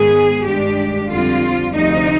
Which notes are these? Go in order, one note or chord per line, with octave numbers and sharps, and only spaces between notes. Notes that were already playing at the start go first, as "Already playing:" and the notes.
Already playing: G#2 D#3 B3 G#4
G2 D#3 G#3 D4 G4
F2 D3 G3 C4 F4
D2 C3 F3 D#4